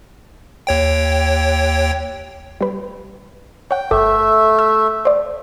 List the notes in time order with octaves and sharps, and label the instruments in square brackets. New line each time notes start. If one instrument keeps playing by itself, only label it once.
[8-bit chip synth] D#2 C#5 G5
[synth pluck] G3 B4
[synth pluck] C#5 F#5 [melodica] G5
[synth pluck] G1 A4 D6 [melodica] A3 E5
[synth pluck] E6
C5 D5